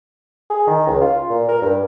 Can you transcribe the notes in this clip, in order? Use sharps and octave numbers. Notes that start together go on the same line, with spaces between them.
G#4
D#3
C#2
F4
A#2
A#4
G2